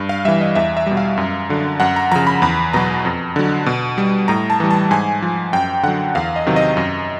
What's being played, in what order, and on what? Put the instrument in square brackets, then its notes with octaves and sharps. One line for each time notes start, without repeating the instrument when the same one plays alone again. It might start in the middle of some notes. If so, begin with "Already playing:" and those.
Already playing: [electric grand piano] G2
F5
E3 G3 E5
D#5
E2 E5
E5
B2 G3
F5
F#2
D3 F#3
F#2 F#5
A#5
C#3 F3 A#5
B5
E2 B5
B2 F#3 A#5
F2
D3 F#3
B2
G3
A2 A#5
A5
E3 G3
A5
G#2 G#5
F3
F#2 G5
D3 F#3 F#5
E2 F5
D#5
C3 D#3 F#3
D#5
F#2